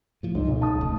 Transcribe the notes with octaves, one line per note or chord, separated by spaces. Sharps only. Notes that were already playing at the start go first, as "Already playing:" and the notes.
A2 F3
C#2 G#2
B1
A5 D#6
E1 C#3 A3